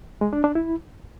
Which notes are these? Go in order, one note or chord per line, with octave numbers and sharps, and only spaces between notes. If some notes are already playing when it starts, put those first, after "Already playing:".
G#3
D4
D4
E4